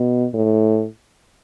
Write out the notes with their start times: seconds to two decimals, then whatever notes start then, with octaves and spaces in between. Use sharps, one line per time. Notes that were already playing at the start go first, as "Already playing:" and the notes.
Already playing: B2
0.34 A2